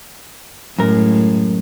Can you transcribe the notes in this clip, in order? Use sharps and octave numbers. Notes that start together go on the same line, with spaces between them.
F#2 A2 G#3 A#4